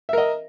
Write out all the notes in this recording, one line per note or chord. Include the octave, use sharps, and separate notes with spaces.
A#4 D#5 E5